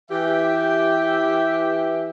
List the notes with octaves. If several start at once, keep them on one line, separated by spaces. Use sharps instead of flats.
E3 G4 E5